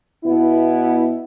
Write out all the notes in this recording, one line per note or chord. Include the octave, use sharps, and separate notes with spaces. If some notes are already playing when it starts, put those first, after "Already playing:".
B2 B3 E4